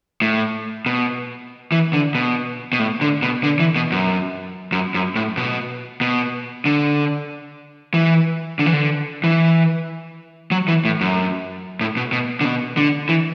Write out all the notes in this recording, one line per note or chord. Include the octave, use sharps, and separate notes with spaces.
A2
B2
E3
D3
B2
B2
A2
D3
B2
D3
E3
B2
F#2
F#2
F#2
A2
B2
B2
D3
E3
D3
E3
D3
E3
F#3
E3
A2
F#2
A2
B2
B2
D3
B2
D3
E3